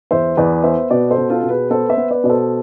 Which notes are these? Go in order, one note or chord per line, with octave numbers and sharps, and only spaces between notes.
E2 C5 E5
E2 B4 D5
B3 C5 E5
B2 B4 D5
A4 C5
B2
F4 A4
B2
G#4 B4
B3 A4 C5
C5 E5
B3
B4 D5
B2 D5
A4 C5